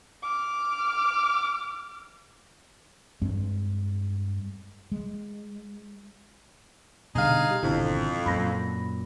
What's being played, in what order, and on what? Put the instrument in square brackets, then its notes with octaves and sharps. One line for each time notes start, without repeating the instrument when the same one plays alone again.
[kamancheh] D6 F6
[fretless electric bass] G2 G#3 C4
G#3
[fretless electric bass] B2 D3 G3 [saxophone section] D#4 G#4 F5
[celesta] G4
[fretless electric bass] G#1 B2 D3 [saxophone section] F2 [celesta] E4
[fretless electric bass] F#2 A#2 [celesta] B5 A#6